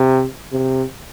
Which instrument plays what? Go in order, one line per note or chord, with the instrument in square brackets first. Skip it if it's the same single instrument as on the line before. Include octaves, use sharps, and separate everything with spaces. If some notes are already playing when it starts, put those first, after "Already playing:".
Already playing: [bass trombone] C3
C3